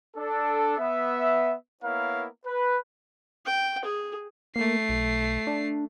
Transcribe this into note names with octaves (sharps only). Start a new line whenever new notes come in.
D4 A4
B3 E5
A#3 B3 E4 A#4 C#5 F5
B4
G5
G#4
A3 A#3 C7
B1
D4